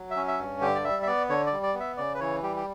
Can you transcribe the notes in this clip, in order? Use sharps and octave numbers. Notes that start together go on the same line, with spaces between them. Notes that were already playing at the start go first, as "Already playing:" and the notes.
Already playing: F#3
E5
C#4
E5
G2
D3 G4
D5
G3 E5
E5
B3 D5
D3 C#5
D5
G3
D5
B3
E5
C#3 D5
B4
E3 C#5
G3 G4
G4